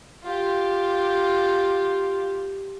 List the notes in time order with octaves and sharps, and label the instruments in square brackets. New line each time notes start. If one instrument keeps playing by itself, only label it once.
[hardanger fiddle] F4 G4